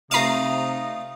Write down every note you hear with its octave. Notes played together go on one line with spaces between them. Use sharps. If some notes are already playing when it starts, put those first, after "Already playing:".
C3 A3 D#4 F4 F5 A#5 C7 D#7